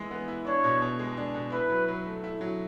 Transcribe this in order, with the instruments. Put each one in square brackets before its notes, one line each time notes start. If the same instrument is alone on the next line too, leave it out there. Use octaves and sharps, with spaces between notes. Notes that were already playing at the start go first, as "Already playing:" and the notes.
Already playing: [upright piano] E3 G#3 B3 E4
B3
E4
[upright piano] D4 [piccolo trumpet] C#5
[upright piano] B2
B2
G#3
D4
B2
[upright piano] E4 [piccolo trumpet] B4
[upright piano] F#3
F#3
A3
E4
F#3